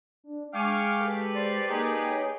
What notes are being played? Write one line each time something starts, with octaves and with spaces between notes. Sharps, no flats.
D4
G#3 F5 G5 G#5 C#6 D6 F6
G4 A4 B4
C5 D5
A#3 D#4 G#4 G5
C#5